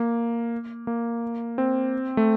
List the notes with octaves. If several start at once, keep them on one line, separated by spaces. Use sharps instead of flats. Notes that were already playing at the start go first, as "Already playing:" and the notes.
Already playing: A#3
A#3
C4
A3